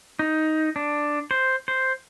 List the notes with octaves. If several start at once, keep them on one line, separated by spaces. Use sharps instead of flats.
D#4
D4
C5
C5